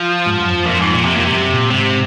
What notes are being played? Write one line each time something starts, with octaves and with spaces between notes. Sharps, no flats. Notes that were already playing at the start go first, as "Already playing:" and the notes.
Already playing: F3
G#2
F#2
F2
F2 A#2
G#2
A#2
C3
F2 A#2
G#2 C3
F#2
A#2
G#2 C3